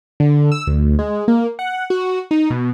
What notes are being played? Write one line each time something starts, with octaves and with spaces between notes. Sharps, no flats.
D3
E6
D2
G#3
A#3
F#5
F#4
D#4
B2